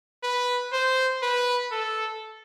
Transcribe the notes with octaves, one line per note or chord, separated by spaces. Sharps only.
B4
C5
B4
A4